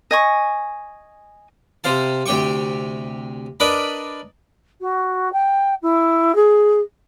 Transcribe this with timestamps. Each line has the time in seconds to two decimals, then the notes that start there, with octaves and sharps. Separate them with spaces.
0.11 D#5 G#5 C#6
1.84 C3 C5 F5 A5
2.26 D2 C3 G4 G5 C#6
3.60 D4 A#4 B4 D5 D#5 B5
4.81 F#4
5.32 G5
5.82 E4
6.35 G#4